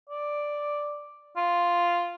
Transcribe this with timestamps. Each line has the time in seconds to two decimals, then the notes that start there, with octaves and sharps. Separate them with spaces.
0.09 D5
1.37 F4